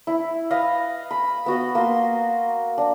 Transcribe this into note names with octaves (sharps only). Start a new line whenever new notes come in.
E4
B4 D#5 F5
B5
B3 F#4 D#5
A#3 C6
D4